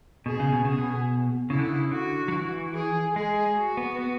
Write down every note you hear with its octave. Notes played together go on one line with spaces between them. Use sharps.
B2 G#4
C#3
B2
C#3 G#4
B2
C#3 E4
D3
C#3
D3 F#4
F#3
E3
G#4
G#3 G#4
F#4
B3
B3